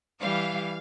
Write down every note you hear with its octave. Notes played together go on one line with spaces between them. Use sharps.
E3 G3 F5